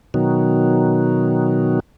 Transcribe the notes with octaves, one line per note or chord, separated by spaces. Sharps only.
B2 D#3 F#3